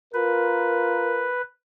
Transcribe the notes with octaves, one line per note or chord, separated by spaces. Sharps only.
F4 A#4 B4